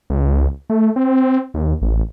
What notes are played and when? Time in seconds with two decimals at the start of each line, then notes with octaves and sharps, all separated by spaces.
0.10 C#2
0.70 A3
0.96 C4
1.54 D#2
1.82 A1